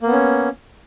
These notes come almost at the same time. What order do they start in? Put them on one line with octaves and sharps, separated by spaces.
A#3 B3 C#4